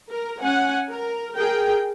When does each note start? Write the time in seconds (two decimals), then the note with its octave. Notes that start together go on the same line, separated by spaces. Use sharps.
0.11 A#4
0.42 C#4 F#5 G#5
0.90 A#4
1.35 G#4 A#4 G5